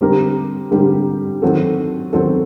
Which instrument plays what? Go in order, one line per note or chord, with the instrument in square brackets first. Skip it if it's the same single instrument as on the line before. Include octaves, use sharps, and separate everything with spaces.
[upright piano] D3 G3 C4 G4 A#4
D3 G3 C4 G4 A#4
D#3 F#3 C4 F#4 A4
D#3 F#3 C4 F#4 A4